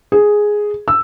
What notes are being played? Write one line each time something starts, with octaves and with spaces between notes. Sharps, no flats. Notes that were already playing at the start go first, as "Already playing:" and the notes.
G#4
E6